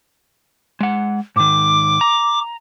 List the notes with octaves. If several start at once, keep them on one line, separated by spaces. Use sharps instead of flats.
G#3 F#5
G#2 D#3 D6
A#5